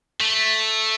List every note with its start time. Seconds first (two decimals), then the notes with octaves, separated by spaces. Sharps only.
0.21 A3